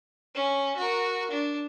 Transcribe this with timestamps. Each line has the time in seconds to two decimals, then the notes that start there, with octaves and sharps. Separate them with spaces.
0.35 C#4
0.76 F#4 A#4
1.31 D4